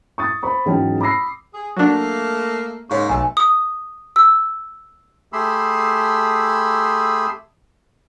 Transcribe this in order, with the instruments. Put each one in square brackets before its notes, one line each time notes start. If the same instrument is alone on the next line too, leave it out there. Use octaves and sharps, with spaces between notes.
[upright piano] C#6 D#6 A6
C5 B5 C#6
E2 G#2 F#3 C#4 G5 A5
B5 D6 E6 A#6 C7
[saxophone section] G#4
[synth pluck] F#3 D4 [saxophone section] A3 A#3
[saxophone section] G#2 C#3 A#3 [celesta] C#5 C#6
[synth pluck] B1 [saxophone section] A3 [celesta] G#5
[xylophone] D#6
E6
[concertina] A3 G4 G#4 B5 C6 E6